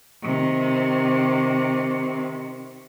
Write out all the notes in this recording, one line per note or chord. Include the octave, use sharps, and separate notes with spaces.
C3 D#3